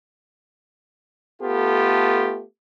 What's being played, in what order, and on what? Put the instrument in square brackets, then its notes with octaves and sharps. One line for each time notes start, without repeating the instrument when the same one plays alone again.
[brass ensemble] A3 B3 F4 G4 A4